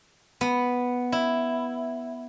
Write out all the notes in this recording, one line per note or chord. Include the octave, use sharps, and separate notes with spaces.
B3
E4